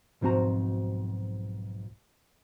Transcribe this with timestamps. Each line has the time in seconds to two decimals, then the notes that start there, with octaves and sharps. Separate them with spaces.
0.21 B1 G#2 F3 C4 F#4 A#5